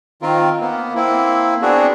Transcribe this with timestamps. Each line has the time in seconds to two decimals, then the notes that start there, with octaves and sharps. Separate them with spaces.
0.22 D#3 C4 F4 A#4
0.61 A#3 B3
0.95 A#3 C4 E4
1.62 B3 C4 D4 F#4 G#4